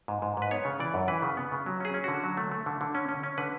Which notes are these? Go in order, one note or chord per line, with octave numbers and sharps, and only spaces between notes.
G#2
G#2
G#2 B4
B3 C#5
C#3
E3 D5
F#2
E3 B4
C#3
B3
C#3
F#3
C#4 G#4
C#4
D3 F#4
F#3
A3
A3
D3
D3
C#4
C#4
C#4
D3 B4